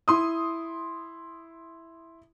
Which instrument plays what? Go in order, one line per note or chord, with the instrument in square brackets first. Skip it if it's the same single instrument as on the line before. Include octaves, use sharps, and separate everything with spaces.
[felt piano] E4 C6 D#6